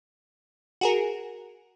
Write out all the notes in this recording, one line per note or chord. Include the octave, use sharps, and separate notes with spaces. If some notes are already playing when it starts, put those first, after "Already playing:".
F#4 G#4 A#4